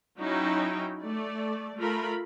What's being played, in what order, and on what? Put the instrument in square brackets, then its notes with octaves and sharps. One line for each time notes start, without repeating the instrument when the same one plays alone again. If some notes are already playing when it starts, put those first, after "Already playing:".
[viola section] F#3 C#4 D#4 E4 G5
A3 D5
A3 F4 A#4 B5